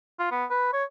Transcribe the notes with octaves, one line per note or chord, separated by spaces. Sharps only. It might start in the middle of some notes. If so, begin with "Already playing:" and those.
F4
B3
B4
C#5